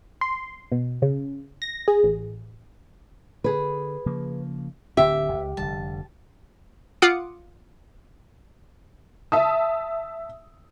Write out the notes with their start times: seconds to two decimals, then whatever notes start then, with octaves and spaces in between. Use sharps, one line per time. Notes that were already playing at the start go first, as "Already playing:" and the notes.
0.21 C6
0.72 B2
1.02 C#3
1.62 A#6
1.88 G#4
2.03 A1
3.44 D3 G#4 B4
4.06 C#3 F3 A#3
4.97 D1 D3 C4 G4 E5
5.33 C#2
5.57 F1 D3 G3 A5
7.02 F4 F#5 D6 D#6 C#7
9.32 E5 A5 D#6